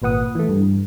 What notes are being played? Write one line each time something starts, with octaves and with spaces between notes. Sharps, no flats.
G#1 A#2 B4 F#5 D#6
E3 A3
G2